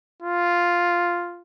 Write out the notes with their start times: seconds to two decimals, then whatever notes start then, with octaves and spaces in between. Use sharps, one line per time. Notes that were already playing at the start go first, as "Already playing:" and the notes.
0.22 F4